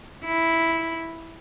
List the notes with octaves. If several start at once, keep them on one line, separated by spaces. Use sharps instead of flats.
E4